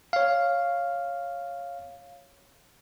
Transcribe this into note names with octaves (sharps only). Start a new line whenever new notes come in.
C#5 F5